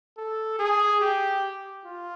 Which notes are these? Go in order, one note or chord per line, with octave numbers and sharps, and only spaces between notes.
A4
G#4
G4
F4